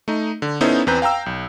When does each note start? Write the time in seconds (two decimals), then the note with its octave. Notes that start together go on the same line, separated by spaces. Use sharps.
0.08 A3 D#4
0.42 D3
0.61 B3 C#4 D#4 E4 A4 C5
0.87 E2 C4 B4 A#5 G6
1.02 F5 G5 A#5 E6
1.26 B1